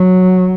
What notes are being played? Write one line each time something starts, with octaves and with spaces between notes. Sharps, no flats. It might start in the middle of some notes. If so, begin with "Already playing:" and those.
Already playing: F#3